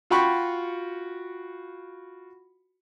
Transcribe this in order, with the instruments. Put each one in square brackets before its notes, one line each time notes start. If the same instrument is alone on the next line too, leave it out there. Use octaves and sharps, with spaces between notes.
[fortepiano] F4 F#4 F5 G5 B5 C#6